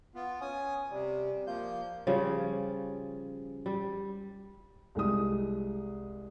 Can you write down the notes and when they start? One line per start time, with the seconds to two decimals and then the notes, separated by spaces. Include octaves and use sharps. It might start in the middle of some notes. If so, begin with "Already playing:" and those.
0.15 B3 F4
0.41 C#4 G#5 D#6
0.91 C3 G3
1.47 F3 A#3 F4 G6
2.07 C#3 F3 G3 C#4
3.66 G3
4.95 C2 G#3 G4 D#6